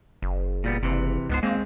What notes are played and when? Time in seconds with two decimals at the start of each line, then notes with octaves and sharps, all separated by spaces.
0.22 F#1
0.64 A#2 G3 B3
0.83 F#1 C3 E3
1.29 C#2 G#2 B3 C5
1.43 G#3 A#3 C4